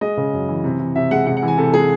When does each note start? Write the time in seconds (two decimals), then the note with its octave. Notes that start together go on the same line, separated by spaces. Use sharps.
0.01 G#3 D#5
0.17 C#3
0.33 F#2
0.48 E3
0.64 C3
0.80 E3
0.95 C3 E5
1.11 G#3 F#5
1.27 C3 F#5
1.37 F#5
1.43 E3
1.48 G#5
1.58 C3 A4
1.74 G#3 G#4